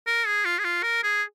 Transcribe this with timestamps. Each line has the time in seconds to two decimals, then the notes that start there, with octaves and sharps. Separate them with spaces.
0.07 A#4
0.26 G#4
0.45 F4
0.59 G#4
0.64 F4
0.83 A#4
1.03 G#4